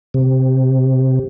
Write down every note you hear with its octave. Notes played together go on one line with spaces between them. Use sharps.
C3